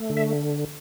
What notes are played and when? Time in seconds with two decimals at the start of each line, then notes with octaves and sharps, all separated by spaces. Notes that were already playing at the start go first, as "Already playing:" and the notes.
Already playing: A3
0.10 D3
0.17 E5